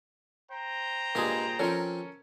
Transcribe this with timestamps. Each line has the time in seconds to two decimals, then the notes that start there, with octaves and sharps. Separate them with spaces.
0.50 C5 G5 A#5
1.15 G2 A#2 G#3 D4 G#4
1.59 F3 C4 C#4 A4 A#4